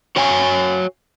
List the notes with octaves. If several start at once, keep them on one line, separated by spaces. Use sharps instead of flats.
F#4 C#5 F5 G#5